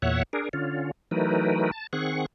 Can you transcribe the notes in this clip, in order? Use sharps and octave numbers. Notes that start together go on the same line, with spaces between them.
E2 A#2 C#5 E5 F#5
D4 G#4 A#4
D3 C#4 F4
E3 F#3 A3 D#4 A#4 B4
A5
D#3 C4 G#4 F#5 C#6